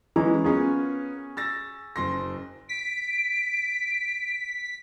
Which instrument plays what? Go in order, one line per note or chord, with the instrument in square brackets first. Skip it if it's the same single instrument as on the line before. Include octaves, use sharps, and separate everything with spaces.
[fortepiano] E3 G#3 C#4 [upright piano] A#5
[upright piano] B3 F4 A#4 [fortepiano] C#4 G#4
[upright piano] E6 A6 A#6
F#1 C6 A#6
[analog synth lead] B6 [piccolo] D7